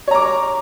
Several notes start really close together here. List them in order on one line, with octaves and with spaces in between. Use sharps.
C#5 A#5 D6